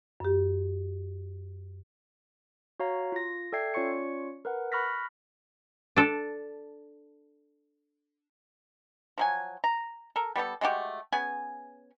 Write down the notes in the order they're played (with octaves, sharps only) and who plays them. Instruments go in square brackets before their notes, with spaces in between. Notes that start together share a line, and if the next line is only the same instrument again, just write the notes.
[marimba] F#2 G4
[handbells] F#4 C#5 F5 A#5
F4 A#6
A4 D5 E5 G5 G#6 C7
C#4 F4 C#5 D5 C#6 C#7
A#4 B4 F#5
B5 C#6 F6 F#6 A#6 B6
[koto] D4 A4
[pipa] F3 F#3 G#5
A#5
A4 A#4
G3 B3 G4 A4
G#3 A3 F#4 G4
B3 C#4 G#4 G#5